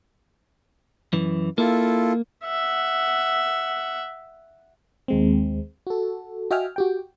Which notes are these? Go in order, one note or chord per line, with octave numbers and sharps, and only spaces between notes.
F#2 E3
A#3 E4 F4 A4
E5 F#5
D#2 G#3 C4
F#4 A4
F#4 D#5 E5 G5 G#5 F6
F#4 G4 G5